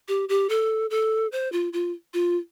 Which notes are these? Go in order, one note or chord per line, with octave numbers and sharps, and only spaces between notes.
G4
G4
A4
A4
C5
F4
F4
F4